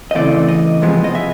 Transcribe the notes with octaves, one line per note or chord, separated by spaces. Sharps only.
D#5
C#3 E3 A3 C4 D5
D#5
C3 F3 G#3 B3
D#5
E5